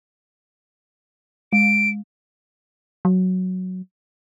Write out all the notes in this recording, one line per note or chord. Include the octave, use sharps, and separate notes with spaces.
G#3 D7
F#3